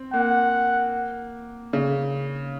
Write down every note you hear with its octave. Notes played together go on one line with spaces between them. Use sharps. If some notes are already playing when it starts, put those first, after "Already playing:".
Already playing: C4
A#3 F#5
C#3